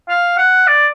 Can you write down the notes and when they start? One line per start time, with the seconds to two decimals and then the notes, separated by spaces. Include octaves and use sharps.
0.09 F5
0.38 F#5
0.67 D5